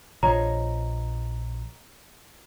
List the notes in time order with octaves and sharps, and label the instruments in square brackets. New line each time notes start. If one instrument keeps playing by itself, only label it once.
[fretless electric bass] A#1 F3 [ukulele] C#5 D#5 [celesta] A#5